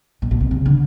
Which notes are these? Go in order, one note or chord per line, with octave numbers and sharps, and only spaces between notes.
A#2
B2
C3
C#3
D3